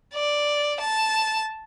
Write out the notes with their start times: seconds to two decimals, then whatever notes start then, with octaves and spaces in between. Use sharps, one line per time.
0.14 D5
0.80 A5